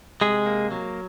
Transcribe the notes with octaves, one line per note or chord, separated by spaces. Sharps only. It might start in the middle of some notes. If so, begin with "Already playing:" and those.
C3 G#3 G#4
A#3
F#3